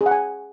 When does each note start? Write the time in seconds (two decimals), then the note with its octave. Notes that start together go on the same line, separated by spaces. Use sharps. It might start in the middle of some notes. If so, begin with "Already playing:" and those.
0.01 G#4
0.06 F#5
0.11 G#5